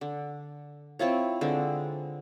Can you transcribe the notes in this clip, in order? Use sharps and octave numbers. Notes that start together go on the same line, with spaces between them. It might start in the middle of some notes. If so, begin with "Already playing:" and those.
D3
C4 E4 F4 C#5
D3 G#3 C4